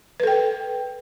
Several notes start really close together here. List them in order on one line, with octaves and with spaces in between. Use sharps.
B4 A4 G5